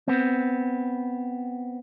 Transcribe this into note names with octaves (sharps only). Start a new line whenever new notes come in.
B3 C4